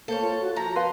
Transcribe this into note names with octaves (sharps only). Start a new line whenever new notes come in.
A#3 A4 C5 C#5 F5
F4
F#4
F3 E5 A5 A#5
B4 F5 C6